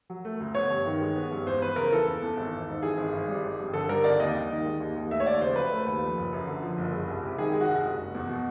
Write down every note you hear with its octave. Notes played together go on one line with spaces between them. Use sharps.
F#3
A3
D2
B3 C#5
G2
D#3
G#3
B3
G2
E2 C5
E2 B4
C#3 A#4
E3 A4
E2
E2
G#1
G#1
G#2
E3 G#4
G#1
G#1
G3
G#1
G2
D3 A4
G3 A#4
G#1 D5
D#2 D#5
D#2
D#3
G#3
D#2
D#2
A3 E5
C#5
D#2 D5
C#3 C5
F#3 B4
A3
D#2
F3
F#1
F#2
D3
F3
F#1
G#3
C2
C3
D#3 G#4
G#3
F#4
C2
F#1
F#1
E2
B2